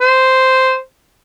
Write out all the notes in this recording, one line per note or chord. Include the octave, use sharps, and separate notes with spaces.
C5